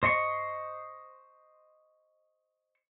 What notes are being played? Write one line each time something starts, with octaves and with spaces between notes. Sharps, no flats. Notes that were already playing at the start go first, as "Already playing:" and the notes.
C5 D#5 C6 C#6